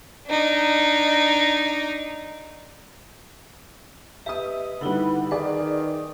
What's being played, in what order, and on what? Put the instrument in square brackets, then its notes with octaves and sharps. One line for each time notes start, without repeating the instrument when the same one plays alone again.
[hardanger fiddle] D4 D#4
[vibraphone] G4 B4 D#5 [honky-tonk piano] E5 D#6
[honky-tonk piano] D3 G3 [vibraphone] D#4 E4 F#5 [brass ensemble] B4
[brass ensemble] D#3 [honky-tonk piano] G#4 D5 [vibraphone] B4 D#6